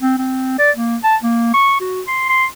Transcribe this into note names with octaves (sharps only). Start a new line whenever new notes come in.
C4
C4
D5
A#3
A5
A#3
C#6
F#4
C6
C6